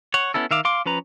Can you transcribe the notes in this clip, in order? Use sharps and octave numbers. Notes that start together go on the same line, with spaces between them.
C#5 F#5
B3 C#4 E4 A4
D#3 E5 F5 D6
F5 C6 D6
F3 C#4 B4 A#5